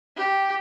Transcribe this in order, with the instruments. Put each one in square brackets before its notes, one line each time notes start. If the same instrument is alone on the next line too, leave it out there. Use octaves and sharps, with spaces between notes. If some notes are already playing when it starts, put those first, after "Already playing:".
[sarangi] G4